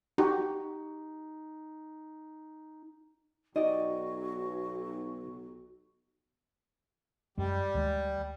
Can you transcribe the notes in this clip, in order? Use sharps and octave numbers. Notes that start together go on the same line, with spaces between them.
D#4 F#4 G4
B1 D#4 F#4 G4 D5 D#5
F#2 G3 G#3
D2 D#3 G#3